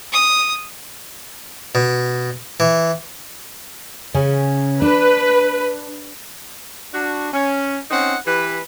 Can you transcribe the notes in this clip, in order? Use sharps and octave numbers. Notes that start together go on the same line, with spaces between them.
D#6
B2
E3
C#3 C#4
D4 B4
D4 F#4
C#4
C4 C#4 D#4 F#5
E3 G4 B4